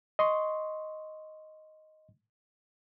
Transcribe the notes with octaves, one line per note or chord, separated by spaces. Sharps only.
D#5 C6 C#6